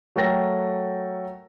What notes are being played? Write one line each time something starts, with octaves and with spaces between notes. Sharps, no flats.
F#3 A3 A4 A#4 G5 A#6